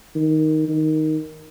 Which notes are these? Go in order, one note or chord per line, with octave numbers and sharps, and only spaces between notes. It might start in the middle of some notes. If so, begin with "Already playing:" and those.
D#3
D#3